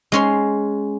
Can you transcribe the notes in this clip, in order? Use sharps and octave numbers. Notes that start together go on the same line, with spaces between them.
G#3 C#4 C6